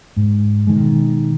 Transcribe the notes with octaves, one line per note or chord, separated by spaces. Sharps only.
G#2
B2 D#3 G#3